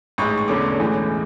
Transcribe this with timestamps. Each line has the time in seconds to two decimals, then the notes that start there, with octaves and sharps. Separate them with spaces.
0.18 A1 G#2 G#3 C#6
0.38 C#6
0.48 E1 E2 D3 A3 C#4 D6
0.79 B1 A2 E3 G#3 C#4